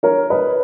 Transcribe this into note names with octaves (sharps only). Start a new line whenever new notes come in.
A#4 C#5
B4 D#5